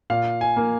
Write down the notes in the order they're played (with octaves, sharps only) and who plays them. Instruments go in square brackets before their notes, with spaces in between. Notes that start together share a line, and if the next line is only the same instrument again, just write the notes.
[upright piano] A#2 [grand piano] F5
[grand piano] G#5
[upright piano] A#3